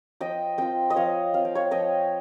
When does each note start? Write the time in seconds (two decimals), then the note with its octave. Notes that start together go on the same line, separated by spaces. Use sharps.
0.20 F3 D#5 G5
0.58 C4 F4 D#5 G5
0.90 D#5
0.96 F3 C#5 F5
1.34 C4 F4 F5
1.45 G5
1.55 C#5 F5
1.71 F3 D#5 G5